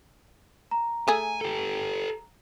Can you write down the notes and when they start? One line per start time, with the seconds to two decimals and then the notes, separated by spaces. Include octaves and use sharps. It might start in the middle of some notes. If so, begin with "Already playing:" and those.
0.71 A#5
1.08 A3 G#4 G#5
1.41 G4 A4